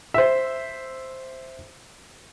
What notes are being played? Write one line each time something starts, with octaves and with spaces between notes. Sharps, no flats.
C5 E5